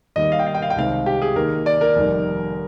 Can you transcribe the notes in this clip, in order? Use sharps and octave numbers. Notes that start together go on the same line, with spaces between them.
D#2 D#3 G3 A#3 D#5
F5
G5
F5
G5
F5
G5
C2 C3 D#3 G#3 C4 F5
G4
G#4
D#2 D#3 A#3 A#4
D5
A#4
F1 D#2 D#3 G3